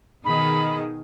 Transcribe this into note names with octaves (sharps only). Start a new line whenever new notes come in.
B2 D#3 G#4 B5